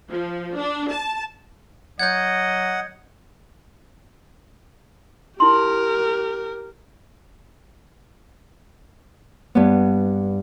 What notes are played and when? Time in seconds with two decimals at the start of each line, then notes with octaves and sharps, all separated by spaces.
0.11 F3
0.57 D4
0.91 A5
1.99 F#3 D#5 F#5 G6 G#6
5.40 E4 G4 A#4 C6
9.55 G2 B3